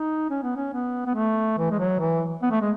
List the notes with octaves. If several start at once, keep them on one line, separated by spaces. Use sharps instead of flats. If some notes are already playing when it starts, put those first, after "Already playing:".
Already playing: D#4
C#4
B3
C#4
B3
B3
A3
E3
G#3
F#3
E3
B3
A3
G#3